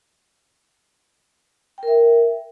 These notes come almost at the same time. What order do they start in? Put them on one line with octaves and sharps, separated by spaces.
G5 A#4 E5